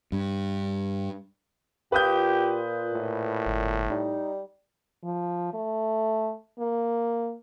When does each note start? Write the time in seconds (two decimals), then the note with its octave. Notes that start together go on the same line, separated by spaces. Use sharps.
0.12 G2
1.92 A#2 F4 G4 B4 D#6 G6
2.93 A2
3.46 G1
3.90 G3 D#4
5.04 F3
5.54 A3
6.59 A#3